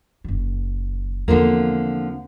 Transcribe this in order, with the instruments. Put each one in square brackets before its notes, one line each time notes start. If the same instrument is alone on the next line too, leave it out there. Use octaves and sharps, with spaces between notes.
[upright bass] F#1 D#3
[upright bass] E2 C4 [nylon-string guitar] D3 F3 A#3